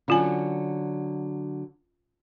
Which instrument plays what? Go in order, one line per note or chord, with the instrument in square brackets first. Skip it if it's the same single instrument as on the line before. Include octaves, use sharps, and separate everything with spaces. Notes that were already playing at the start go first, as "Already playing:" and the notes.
[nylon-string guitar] D3 F#3 [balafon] C#4 F4 G#5